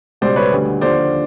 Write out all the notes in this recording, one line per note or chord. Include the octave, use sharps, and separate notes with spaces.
C#2 B2 G3 C5 D5
B4 C#5
D2 D3 G3
D#2 D3 F3 C5 D5